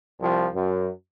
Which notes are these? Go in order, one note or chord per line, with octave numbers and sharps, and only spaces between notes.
C2 F3
F#2